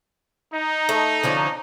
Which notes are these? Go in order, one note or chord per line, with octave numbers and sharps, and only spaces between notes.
D#4
A3
D3 F3 C#4